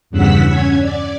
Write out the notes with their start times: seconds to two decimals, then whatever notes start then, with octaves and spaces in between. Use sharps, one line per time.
0.10 E2 G2 C#3 F#5 E6 B6
0.46 C#4 G#6
0.81 D5